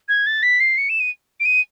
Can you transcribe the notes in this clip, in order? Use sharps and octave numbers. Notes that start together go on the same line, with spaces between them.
G#6
A6
B6
C7
C#7
E7
D#7
D7
D#7